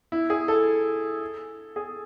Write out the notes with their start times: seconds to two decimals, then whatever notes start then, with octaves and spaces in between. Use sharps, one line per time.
0.12 E4
0.30 G#4
0.48 A4
1.76 G#4